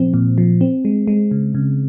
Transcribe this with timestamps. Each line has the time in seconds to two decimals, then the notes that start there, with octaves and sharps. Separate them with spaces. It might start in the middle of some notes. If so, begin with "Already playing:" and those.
Already playing: A#2 F3 C4
0.14 A#2
0.38 F3
0.61 C4
0.85 G#3
1.07 G#3
1.31 C#3
1.55 C#3